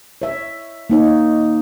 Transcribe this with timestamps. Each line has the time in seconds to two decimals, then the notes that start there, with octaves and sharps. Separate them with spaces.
0.22 C#5 E5
0.90 A#3 D#4 C#5